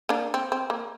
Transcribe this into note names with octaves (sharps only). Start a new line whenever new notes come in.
A#3 D4
C4
C4
A#3